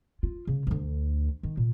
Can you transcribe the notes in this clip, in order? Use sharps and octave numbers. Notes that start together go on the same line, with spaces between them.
F4
C#3
D2 D3
D#3
A#2